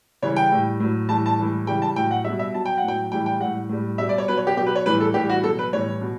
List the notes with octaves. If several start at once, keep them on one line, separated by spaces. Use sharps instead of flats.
C#3 E3 G3 C#5
G5
A2 G3
A2 F#3
A2 E3 G3 A5
A5
A2 E3 G3
C#3 E3 G3 G5
A5
A2 F#3 G5
F#5
B2 G3 E5
E5
B2 F#3 A5
G5
A2 F#5
F#3 G5
A2 E3 G3 G5
G5
A2 G3 F#5
A2 G3
B2 G3 E5
D5
C#5
B2 F#3 B4
C#5
G4
B2 F#3 G4
B4
C#5
A2 E3 G3 B4
A4
A2 E3 G3 G4
F#4
B2 F#3 A4
B4
A2 E3 G3 C#5
B2